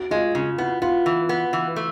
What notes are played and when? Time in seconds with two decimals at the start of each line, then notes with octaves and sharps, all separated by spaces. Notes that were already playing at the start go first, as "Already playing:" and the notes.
Already playing: F#4
0.11 G#3 F4
0.35 C#3 F4
0.58 B3 E4
0.82 B3 F4
1.06 E3
1.29 B3
1.53 E3
1.76 A3